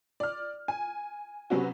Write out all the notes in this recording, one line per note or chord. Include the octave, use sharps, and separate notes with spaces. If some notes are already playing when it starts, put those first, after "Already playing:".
D5 F6
G#5
C3 F#3 B3 C#4 F#4